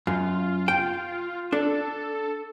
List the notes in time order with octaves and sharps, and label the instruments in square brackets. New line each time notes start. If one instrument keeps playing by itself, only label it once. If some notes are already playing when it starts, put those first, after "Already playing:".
[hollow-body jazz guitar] F#2 [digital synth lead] F4
[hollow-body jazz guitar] G5
[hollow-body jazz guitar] D4 [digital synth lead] A4